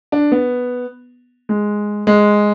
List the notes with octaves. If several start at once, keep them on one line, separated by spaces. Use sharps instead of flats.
D4
B3
G#3
G#3